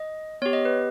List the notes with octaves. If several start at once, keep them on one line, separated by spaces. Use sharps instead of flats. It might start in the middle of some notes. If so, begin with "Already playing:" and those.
Already playing: D#5
B3 G4 C#5
D#5
B4